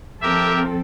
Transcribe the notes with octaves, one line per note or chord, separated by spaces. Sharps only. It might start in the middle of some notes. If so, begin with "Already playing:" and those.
F3 C4 G4 A4 A#4 E5